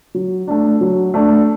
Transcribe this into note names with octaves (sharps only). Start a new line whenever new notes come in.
F#3
A3 D4
F#3
A3 D4